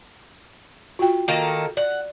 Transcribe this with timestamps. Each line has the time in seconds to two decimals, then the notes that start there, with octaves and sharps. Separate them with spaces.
0.99 F4 F#4 G5
1.28 D#3 A#3 A4
1.77 D5 F#5